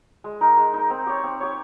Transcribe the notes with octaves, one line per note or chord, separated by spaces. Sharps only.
G#3
D#4 A#4
G#3
D#4 A#4
C4
G4 C#5
C4
G4 C#5